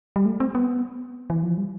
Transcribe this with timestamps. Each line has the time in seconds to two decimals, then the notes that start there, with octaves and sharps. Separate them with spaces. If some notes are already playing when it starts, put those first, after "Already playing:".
0.16 G3
0.26 A3
0.40 C4
0.55 B3
1.30 E3
1.43 F3
1.57 G3